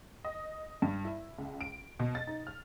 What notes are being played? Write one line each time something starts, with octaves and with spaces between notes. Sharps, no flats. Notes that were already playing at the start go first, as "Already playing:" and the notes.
D#5
G2
E4
C#2
D7
B2
A6
D#4
F6